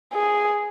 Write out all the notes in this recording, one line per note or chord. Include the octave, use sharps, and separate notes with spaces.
G#4